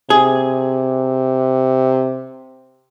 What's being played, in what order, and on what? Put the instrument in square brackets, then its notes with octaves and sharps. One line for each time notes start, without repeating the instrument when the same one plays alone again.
[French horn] C3 [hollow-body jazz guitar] G#4